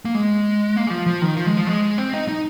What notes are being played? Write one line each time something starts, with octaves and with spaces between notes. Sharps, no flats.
A#3
G#3
A#3
G#3
F3
F3
D#3
F3
G#3
F3
G#3
C4
D#4
D#4